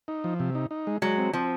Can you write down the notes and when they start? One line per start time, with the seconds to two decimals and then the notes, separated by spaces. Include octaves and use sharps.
0.08 D#4
0.24 F3
0.40 C3
0.55 D#4
0.71 D#4
0.87 G#3
1.02 F#3 G#3
1.18 C4
1.33 F3 C4